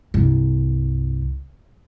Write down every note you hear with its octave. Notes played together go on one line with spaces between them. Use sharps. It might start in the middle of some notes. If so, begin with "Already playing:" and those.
C2 G2